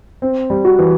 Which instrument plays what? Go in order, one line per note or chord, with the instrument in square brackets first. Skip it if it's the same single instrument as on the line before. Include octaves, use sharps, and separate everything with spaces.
[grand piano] C4
G3
[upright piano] F#4
[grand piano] E3